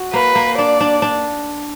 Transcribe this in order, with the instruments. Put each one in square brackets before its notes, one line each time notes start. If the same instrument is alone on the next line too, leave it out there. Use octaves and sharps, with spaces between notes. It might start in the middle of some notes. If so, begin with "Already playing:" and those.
Already playing: [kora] F#4
[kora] A#3 [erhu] B4
[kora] A#3
[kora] D4 [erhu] D5
[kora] D4
D4